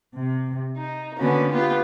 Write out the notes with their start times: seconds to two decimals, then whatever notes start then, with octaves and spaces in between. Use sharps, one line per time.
0.15 C3
0.77 D#4
1.18 D3 A#3 B3 C#4 F#4
1.51 B3 F4 G4